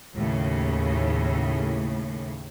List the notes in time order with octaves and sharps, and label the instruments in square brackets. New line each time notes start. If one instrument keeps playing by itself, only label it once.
[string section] D#2 A2 C#3